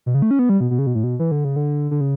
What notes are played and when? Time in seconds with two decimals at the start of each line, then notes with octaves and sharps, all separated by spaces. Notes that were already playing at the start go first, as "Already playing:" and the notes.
0.06 B2
0.15 C#3
0.22 A3
0.31 C#4
0.39 B3
0.49 G3
0.60 B2
0.71 B2
0.79 C#3
0.87 B2
0.95 A2
1.04 B2
1.20 E3
1.31 D3
1.45 C#3
1.56 D3
1.91 D3
2.01 C#3